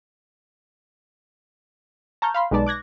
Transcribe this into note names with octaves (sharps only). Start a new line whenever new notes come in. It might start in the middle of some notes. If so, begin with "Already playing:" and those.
A5 A#5 C#6 F6 G6
F5 B5 C6
B1 G#3 D#4 B4 D5 A5
D6 F#6 G#6 A#6